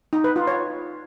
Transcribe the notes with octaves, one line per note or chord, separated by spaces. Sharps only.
D#4
B4
F4
C#5